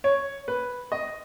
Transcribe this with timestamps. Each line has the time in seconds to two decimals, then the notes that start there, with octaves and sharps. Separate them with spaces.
0.04 C#5
0.48 B4
0.92 D#5